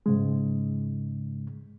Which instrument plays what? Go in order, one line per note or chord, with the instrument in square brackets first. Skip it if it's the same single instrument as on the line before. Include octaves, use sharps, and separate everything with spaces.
[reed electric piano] G#2 C#3 G#3